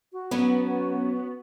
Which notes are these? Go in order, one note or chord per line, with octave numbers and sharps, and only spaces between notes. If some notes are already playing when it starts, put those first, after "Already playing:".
F#4
F#3 B3 C#4